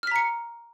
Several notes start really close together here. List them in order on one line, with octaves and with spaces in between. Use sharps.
F6 B6 A#5 C#7